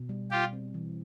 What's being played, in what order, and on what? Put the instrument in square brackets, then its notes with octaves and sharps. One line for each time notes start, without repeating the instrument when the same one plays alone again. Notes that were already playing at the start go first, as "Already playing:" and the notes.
Already playing: [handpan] B2
G3
[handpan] B2 [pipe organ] F4 G4
[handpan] C4
E3